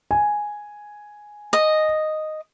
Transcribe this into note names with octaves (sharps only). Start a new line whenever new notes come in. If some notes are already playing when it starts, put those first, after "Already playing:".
G#5
D#5